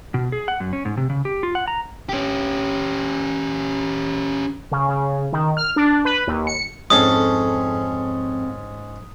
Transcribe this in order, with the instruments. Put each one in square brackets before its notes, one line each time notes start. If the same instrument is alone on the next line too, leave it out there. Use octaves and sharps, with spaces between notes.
[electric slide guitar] B2
G#4
F#5
F#2
C#4
G#2
C3
C#3
G4
F4
F#5
A#5
[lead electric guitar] C#4 G4
[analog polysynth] C#3
C#3
D#3
F6
D4
B4
D#2
C#7
[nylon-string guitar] F2 C4 A4 [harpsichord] G#2 C#4 [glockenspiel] D#6